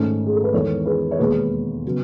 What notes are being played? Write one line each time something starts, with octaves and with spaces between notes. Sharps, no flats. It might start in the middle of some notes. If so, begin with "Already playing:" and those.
Already playing: G#2 D#3 A3 C#4
G#4
A4
B4
E2 D#3 G#3 B3 A4 C#5
G#4 B4
C#5
E1 D#2 D#3 G#3 B3 G#4 B4
C#3 F#3 B3